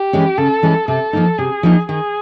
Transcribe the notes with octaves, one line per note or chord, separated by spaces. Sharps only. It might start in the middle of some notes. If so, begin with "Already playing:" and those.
Already playing: G4
E3 G#3 C#4
C#3 A4
E3 G#3 C#4
C3 A4
F3 A#3 D#4
C3 G#4
F3 A#3 D#4
D#3 G#4